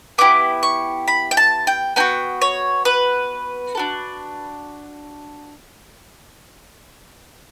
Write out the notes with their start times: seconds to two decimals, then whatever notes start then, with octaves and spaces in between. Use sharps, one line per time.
0.18 B3 E4 G4 D6
0.63 C#6
1.08 B5
1.31 G5
1.37 A5
1.67 G5
1.96 B3 D4 F#4 G5
2.42 C#5
2.85 B4
3.75 A4
3.77 D4 F#4